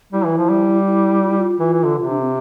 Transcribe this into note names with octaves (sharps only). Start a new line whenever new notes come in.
G3 E4
E3
F3
G3
E4
F4
E4
F4
E3 F4
E3
D3
C3 F4
D4
C4